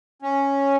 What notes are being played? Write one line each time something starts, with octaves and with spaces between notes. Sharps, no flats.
C#4